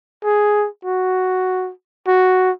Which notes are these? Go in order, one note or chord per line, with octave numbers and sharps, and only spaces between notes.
G#4
F#4
F#4